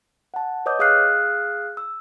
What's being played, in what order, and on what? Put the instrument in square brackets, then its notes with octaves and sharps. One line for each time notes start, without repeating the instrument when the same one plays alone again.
[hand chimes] F#5 A5
B4 C#5 D#5 D6 D#6 G6
G#4 F5 D#6 F6 F#6 C7
E6